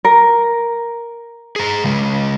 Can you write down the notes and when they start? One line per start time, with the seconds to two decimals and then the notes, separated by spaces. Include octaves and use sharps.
0.05 A#4
1.56 G#4 A#5
1.84 C#3 G#3